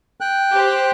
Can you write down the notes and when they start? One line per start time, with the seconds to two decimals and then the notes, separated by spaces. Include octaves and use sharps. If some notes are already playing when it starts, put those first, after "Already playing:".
0.21 G5 F#6
0.51 G4 C5